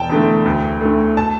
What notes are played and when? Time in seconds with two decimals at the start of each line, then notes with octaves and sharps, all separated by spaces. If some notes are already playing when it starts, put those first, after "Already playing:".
Already playing: E1 G5 A5
0.10 E2 D3 A3
0.45 D2
0.81 D3 A3
1.17 A5